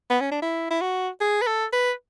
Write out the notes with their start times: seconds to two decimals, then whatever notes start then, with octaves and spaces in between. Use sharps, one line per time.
0.10 B3
0.21 C#4
0.31 D4
0.42 E4
0.71 E4
0.81 F#4
1.21 G#4
1.42 B4
1.47 A4
1.73 B4